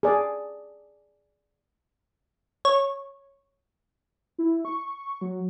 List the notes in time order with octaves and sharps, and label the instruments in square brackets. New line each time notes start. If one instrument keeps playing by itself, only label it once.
[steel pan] G#4 D5
[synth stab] C#5
[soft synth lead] E4
C#6
F#3